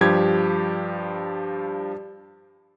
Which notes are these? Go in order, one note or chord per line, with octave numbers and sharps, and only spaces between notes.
G2 F3 G4 G#6